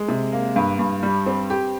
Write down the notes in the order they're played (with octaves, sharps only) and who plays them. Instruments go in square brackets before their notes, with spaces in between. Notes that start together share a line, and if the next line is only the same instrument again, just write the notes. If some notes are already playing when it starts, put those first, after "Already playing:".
Already playing: [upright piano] G#3
C3
A#3
G2
G2
G3
C4
G4